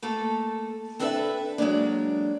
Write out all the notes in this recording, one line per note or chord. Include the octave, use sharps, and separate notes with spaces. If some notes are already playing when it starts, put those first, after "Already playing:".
A3 A#3 A4
C4 D4 E4 A4 B4 E5
F#3 G#3 A#3 D4